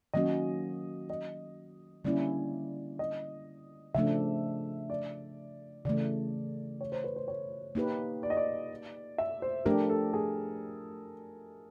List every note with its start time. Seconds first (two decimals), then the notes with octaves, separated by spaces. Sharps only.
0.13 D#3 F#3 A#3 C#4 F#4 D#5
1.10 D#5
2.05 D3 G3 A#3 C#4 E4 D5
2.99 D#5
3.94 C#3 F3 A3 D4 E5
4.90 D5
5.85 C#3 E3 A3 D5
6.81 C#5
6.92 C5
7.04 B4
7.16 C5
7.28 C#5
7.75 A#3 D#4 G4 B4
8.23 D5
8.30 D#5
8.37 D5
9.18 E5
9.42 C5
9.65 F3 A3 D4 G4 A#4
9.90 A4
10.14 G#4